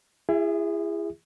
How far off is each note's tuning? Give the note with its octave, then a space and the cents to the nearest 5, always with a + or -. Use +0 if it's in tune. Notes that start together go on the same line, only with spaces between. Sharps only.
E4 +35 G#4 -25 E5 -5